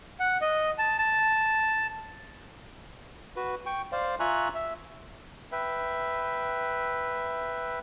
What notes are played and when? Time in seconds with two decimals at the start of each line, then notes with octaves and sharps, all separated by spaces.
0.20 F#5
0.41 D#5
0.78 A5
0.99 A5
3.36 F#4 B4
3.66 G5 C#6
3.92 C5 D5 F5
4.20 F4 E5 G#5 A#5 C#6 F#6
4.55 E5
5.52 B4 E5 G5